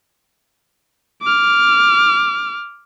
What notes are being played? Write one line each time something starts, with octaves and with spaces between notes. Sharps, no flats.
D6 F6